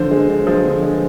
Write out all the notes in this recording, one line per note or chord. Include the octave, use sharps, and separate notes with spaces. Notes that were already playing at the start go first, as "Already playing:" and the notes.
Already playing: D3 F3 C5
G#3
D3
F3
D3
G#3